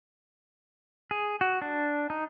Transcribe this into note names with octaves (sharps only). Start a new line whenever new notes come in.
G#4
F#4
D4
D#4